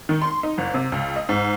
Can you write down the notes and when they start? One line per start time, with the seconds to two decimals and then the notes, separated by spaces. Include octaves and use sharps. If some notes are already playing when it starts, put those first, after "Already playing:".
0.09 D#3
0.22 C6
0.43 D#4
0.58 F#1
0.74 C3
0.92 C#2
1.16 D#5
1.29 G#2